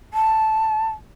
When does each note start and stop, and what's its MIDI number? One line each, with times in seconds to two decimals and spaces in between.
0.14 0.89 81